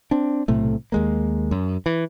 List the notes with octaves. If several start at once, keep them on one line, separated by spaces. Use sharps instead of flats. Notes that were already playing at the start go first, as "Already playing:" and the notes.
C4 D4
B1 A2 C3 A3
D#2 G#3 A#3
F#2
E3